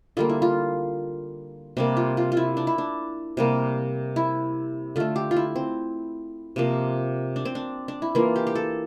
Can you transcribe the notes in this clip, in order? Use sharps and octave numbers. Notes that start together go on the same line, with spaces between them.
D3 G3 A#3 F4
E4
F4
C3 G3 A#3 D4
F4
F4
F4
E4
D4
E4
D4
C3 G3 A#3
E4
D3 A3 F4
G4
F4
E4
C4
C3 F3 A#3
D4
C4
D4
D4
E4
E3 A#3 F4
G4
G4
A4